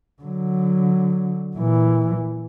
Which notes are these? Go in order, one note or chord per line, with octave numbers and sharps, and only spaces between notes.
D3 F#3
A#2 E3